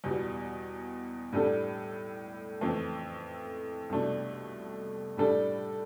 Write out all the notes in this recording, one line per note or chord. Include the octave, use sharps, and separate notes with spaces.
E2 B2 G3
A2 G3 D4 A4
F2 E3 A3
C2 B2 A3 D4
A2 G3 D4 A4